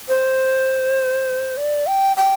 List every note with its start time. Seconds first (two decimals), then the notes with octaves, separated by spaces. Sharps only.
0.08 C5
1.57 D5
1.87 G5
2.17 G5